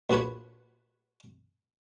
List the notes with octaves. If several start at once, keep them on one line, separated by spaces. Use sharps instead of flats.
A#1 F3 F#4 B4 C#5